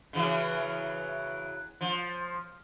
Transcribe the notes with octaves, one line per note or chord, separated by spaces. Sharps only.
C#3 E3 F#3
F3